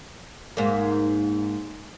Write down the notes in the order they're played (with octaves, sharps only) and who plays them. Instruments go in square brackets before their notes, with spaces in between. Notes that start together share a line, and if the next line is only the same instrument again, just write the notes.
[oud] G#2 A#3